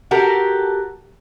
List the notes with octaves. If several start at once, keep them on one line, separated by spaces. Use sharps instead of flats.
F#4 G4 A4 A#4